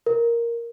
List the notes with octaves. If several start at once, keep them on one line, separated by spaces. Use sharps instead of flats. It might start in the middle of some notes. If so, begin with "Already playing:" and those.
A#4